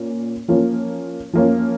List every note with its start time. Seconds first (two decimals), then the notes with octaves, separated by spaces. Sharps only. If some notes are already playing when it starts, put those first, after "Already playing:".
Already playing: A#2 A#3 C#4
0.48 F3 A#3 C#4 F4
1.33 F3 A#3 C#4 F4